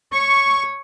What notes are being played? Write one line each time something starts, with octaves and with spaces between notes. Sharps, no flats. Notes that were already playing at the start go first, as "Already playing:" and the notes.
C#5 C#6